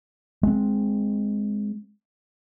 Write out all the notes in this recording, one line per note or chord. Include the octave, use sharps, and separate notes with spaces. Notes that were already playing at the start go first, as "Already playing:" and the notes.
G#3 C4